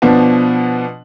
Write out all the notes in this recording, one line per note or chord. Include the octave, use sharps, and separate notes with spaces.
B2 F3 B3 D4